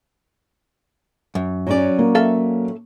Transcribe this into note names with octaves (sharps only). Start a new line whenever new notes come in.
F#2
F#3 C#4 D5
A#3
A4 E5 F5